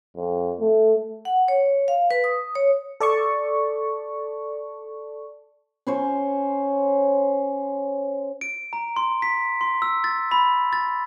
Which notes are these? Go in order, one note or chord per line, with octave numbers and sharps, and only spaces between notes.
F2
A3
F#5
C#5
F5
B4
D#6
C#5
A4 D5 A5 C#6
C#4 C5 C#5
D7
A#5
C6
B6
C6
E6
A6
B5
A6